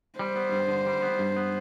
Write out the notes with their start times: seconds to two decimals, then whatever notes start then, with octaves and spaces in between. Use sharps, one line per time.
0.19 G3 C5
0.36 B3
0.52 G2
0.68 D3
0.86 G3
1.02 B3
1.19 G2
1.36 B3